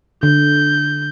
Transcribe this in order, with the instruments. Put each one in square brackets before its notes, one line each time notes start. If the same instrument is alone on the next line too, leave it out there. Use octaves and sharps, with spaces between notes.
[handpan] D3 [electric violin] G6